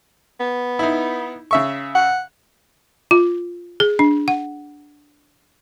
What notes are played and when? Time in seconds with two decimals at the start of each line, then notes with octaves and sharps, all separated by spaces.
0.40 B3
0.79 D#4 E4
1.51 C#3 E5 C#6
1.95 F#5
3.11 F4
3.80 G#4
3.99 D4
4.28 F#5